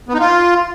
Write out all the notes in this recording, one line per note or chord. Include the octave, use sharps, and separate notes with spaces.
B3
D#4
F4